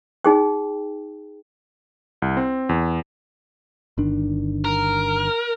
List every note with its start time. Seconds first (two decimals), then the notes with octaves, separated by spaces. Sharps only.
0.25 D#4 G#4 G5
2.22 C2
2.37 C4
2.69 E2
3.98 G1 D#3 D4
4.65 A#4